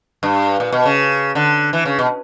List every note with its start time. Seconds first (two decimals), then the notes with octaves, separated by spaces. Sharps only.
0.23 G2
0.60 A#2
0.72 B2
0.85 C#3
1.35 D3
1.73 E3
1.85 C#3
1.99 B2